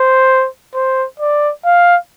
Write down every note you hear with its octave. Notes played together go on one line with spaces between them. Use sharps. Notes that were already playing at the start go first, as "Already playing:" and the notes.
Already playing: C5
C5
D5
F5